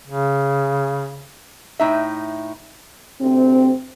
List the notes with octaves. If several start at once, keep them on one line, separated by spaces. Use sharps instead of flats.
C#3
A2 D#4 E5
D2 C3 C4